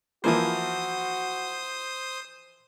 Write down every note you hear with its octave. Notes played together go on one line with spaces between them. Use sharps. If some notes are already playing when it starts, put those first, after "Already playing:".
E3 F3 A#3 F#4 C5 D#6